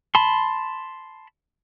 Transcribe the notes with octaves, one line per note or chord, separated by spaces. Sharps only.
A5 B5 C6